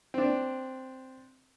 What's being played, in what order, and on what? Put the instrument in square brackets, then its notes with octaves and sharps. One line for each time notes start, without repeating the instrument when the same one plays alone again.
[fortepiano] C4 D4